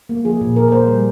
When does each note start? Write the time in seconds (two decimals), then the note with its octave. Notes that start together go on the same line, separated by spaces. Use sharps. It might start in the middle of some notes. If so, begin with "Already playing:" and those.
0.09 A#3
0.25 F3 G#4
0.41 A#2
0.56 A#2 A#4
0.68 A#4
0.72 A#3 C5
0.88 G3